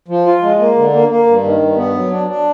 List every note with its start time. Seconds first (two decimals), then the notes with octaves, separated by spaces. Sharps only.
0.08 F3
0.26 F4
0.42 G#3
0.59 A#3
0.76 D3
0.93 A#3
1.09 A#3
1.27 G2
1.44 D#3
1.60 G2
1.76 B3
1.94 F#3
2.11 D4
2.27 D4